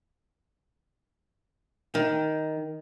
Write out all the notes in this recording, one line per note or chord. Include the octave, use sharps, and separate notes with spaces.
D#3